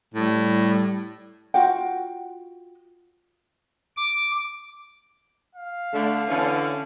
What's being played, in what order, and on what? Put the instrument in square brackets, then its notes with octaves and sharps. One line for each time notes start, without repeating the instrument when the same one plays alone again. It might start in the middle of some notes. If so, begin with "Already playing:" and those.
[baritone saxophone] A2 [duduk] G3
[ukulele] F4 F#4 F#5 G5
[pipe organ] D6
[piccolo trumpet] F5
[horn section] D3 A3
D3 E3 C#4